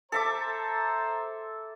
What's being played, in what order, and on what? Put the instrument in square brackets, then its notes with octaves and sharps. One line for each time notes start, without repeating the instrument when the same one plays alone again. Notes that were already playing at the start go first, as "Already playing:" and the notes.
[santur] A4 E5 D6 [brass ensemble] C5 A5 A#5